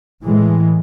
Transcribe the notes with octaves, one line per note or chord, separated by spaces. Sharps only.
A2 E3 G#3